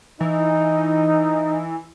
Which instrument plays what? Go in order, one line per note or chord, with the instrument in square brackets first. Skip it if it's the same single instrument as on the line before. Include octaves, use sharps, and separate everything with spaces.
[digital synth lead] E3 [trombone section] D#4